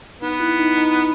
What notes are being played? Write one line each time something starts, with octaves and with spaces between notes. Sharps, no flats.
B3 D#4
E4
D#4
D#4